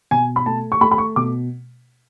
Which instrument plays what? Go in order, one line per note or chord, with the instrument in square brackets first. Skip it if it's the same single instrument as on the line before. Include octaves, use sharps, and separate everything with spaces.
[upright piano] B2 G#5
B5
A3 A5
C#6
A3 B5
B5
C#6
B2 D6